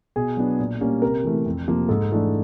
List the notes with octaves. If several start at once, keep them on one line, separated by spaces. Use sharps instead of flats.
B2 G#4
F#3 B3 D4
A#2
G3 A#3 C#4
C3 A#4
E3 A3
F2
C3 F3 A#3
G#2 A4
E3 A3 D4